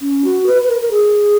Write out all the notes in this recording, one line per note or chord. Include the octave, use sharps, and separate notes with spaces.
C#4
F#4
B4
B4
A#4
A#4
G#4